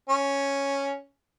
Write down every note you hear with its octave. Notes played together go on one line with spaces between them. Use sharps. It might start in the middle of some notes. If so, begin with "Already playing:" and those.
C#4